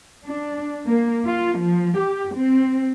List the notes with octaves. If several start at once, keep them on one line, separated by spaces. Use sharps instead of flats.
D4
A#3
F4
F3
G4
C4